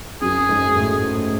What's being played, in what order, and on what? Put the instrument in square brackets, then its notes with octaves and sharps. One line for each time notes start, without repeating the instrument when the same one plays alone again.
[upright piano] F#2 F#3 [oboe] G#4
[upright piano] G#2 G#3
A2 A3